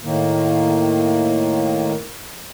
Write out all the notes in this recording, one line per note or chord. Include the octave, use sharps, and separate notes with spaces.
A2 D#3 A#3